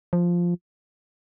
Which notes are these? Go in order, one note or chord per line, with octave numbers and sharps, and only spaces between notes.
F3